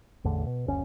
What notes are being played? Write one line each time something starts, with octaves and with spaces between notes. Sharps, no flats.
A1 E2 D3 A3
B2
F#1 D2 C#4